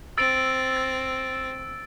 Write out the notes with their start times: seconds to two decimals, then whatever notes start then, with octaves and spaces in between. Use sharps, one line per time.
0.18 C4 E6 A6 D7
0.77 A6